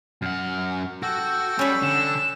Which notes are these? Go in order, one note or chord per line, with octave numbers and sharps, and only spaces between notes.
F#2 F#5 F6
F#4 A4 G5 G6
G3 C#4 C#5 B5
D3 E7